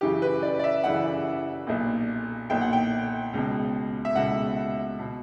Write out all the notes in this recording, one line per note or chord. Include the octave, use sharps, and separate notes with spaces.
F#2 C#3 E3 G4
B4
D5
D5
E5
F#2 C#3 E3 F#5
B1 A#2
B1 A#2 G5
F#5
G5
C#2 B2
E5
C#2 B2 F#5
B2